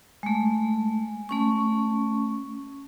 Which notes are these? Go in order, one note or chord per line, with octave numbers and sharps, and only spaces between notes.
G#3 A3
A3 C#4 C#6